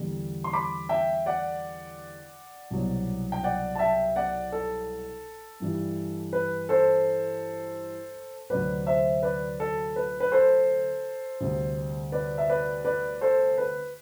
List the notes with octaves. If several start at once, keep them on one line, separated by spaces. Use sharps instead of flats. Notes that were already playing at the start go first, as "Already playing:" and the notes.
Already playing: E2 D3 G3
C6
B5 D6
E5 G5
D5 F#5
C2 B2 F#3
G5
D5 F#5
A5
E5 G5
D5 F#5
A4
G2 E3 G3
B4
A4 C5
D2 C3 F#3 B4 D5
C5 E5
B4 D5
A4
B4
B4
A4 C5
D2 C3 G3
B4 D5
E5
B4 D5
B4 D5
A4 C5
B4